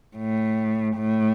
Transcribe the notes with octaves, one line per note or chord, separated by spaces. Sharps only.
A2
A2